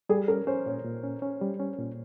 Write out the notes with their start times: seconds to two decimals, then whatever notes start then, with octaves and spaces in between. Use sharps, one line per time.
0.09 G3 G#4
0.28 C#4 A#4
0.47 C#4 C5
0.66 A#2 C#5
0.84 A#2
1.03 C#4
1.22 C#4
1.41 G3
1.60 C#4
1.78 A#2